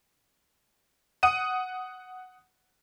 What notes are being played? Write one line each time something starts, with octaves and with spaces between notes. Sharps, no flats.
F#5 D#6 D#7